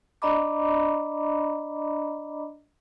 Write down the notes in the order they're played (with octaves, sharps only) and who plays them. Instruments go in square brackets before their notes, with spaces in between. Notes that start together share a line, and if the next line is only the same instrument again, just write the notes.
[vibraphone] D4 D5 D#5 A#5 B5 D6